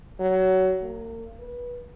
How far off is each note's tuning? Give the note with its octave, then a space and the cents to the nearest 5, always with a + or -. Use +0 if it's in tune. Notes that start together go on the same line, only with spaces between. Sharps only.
F#3 +20
A#3 -40
B4 -25